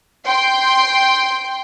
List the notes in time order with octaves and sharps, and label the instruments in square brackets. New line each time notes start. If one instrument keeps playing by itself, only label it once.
[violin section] G5 C6